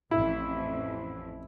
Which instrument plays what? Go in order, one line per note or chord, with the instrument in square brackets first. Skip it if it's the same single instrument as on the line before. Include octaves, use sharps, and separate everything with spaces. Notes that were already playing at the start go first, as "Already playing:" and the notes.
[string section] A1 F2 [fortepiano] E4